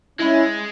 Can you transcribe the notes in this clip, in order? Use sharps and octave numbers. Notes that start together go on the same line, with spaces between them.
G#3 C#4 E4